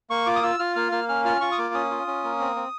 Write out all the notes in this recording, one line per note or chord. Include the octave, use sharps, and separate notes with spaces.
A#3 C#6
F4 D6
D#6
F4 E6
F4 F6
A#3 F6
A#3 F6
C#4 F6
F4 F6
F4 C#6
D#6
A#3 D6
C#4 D#6
F4
C#4
A#3
C4
C4